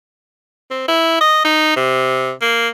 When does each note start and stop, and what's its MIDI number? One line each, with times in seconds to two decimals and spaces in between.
0.71 0.86 60
0.88 1.17 64
1.21 1.44 75
1.45 1.76 63
1.77 2.32 48
2.42 2.68 58